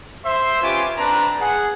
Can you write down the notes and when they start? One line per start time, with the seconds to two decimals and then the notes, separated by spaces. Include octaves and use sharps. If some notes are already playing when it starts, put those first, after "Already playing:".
0.25 C5 E5 C6
0.62 C#4 F4 G4 B4 G#5 D6
0.97 C4 D4 B4 A5 A#5
1.39 G#4 F#5